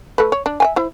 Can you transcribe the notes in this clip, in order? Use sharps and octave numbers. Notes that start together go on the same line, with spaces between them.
A3 A4 B4
C#5
D4
E5 G5 G#5
E4 C5